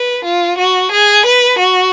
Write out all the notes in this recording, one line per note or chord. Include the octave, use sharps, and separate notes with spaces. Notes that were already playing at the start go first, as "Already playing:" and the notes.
Already playing: B4
F4
F#4
G#4
B4
F#4